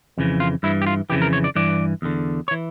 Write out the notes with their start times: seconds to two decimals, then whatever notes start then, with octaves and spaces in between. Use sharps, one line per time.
0.18 F2 C#3 E3
0.40 F4
0.63 G2 E3 E4
0.82 G4
0.87 F4
1.10 F2 C#3 E3 G4
1.22 A#4
1.33 C#5
1.44 D5
1.55 G2 E3 D5
2.02 E2 D3
2.48 C#5
2.51 E3